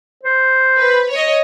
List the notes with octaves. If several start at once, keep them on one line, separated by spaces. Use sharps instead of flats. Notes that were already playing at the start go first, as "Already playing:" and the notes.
C5
B4
C#5 D#5